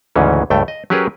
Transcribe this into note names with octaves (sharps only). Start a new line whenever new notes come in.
D2 G#2 C#3 E3 C#4
C#2 G2 A3 G5
D#5
F#3 C#4 G4 G#4 A#4 B4